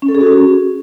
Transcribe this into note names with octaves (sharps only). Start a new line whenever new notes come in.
C#4
A4
G#4
F#4
C#4